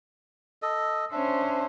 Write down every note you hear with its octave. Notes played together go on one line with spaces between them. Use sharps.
A4 D#5
C#4 D4 C5 E5